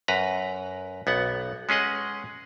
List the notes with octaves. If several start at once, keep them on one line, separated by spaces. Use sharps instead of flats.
F#2 B4 A#5
B1 B3 F#5
G#3 C#4 G#4 D#5 F#5